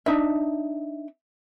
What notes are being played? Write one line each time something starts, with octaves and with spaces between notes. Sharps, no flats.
D4 D#4 E5